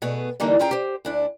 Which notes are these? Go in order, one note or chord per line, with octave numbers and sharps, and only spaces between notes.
B2 A3 B3 G#4
D3 E3 G3 A#3 D#4
C#4 F4 G#4 G5 A#5
G4 C5
D2 D4 E4